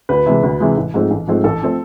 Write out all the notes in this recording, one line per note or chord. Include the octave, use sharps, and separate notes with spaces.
D2 B4
C3 E3 G#3
D2
C3 E3 G#3
A1
G#2 F3 A3 C4
A1
G#2 F3 A3 C4
A1 A4
F3 A3 C4